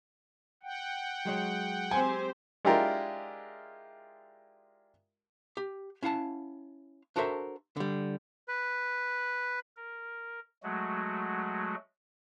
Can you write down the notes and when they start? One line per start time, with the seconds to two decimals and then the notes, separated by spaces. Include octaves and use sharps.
0.63 F#5 G5
1.25 F#3 G#3 C#5
1.91 C4 G4 C5 G#5
2.65 G#3 D4 E4 F4 G4 A#4
5.57 G4
6.03 C#4 E4 F5 F#5 A5
7.16 D4 F#4 A4 A#4 C5 E5
7.77 D3 G3
8.48 B4
9.77 A#4
10.63 F#3 G#3 A3 F#4